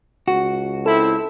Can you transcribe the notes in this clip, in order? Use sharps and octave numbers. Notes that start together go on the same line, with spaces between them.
C#2 F#4
C4 E4 A4